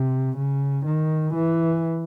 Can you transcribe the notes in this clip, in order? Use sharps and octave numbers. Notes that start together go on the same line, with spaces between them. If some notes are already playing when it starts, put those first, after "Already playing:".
Already playing: C3
C#3
D#3
E3